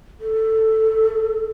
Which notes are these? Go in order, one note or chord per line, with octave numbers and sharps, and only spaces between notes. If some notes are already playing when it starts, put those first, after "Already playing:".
A4